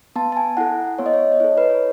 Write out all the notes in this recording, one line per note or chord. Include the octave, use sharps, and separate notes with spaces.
B3 A5
A5
G#5
E4 A4 F#5
B3 C#5
D#5
C#5
D#5
E4 A4 C#5
B4
C#5